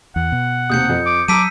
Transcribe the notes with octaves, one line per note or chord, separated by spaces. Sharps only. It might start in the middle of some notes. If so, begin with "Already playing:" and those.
E2 F#5
B2
D#2 C3 D#6 G6 C#7
F2
D6
F#3 A5 A#5 D6 E6 B6 D#7